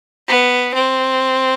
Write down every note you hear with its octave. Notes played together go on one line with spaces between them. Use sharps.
B3
C4